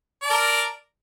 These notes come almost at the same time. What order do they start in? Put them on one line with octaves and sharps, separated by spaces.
D5 A5 A#4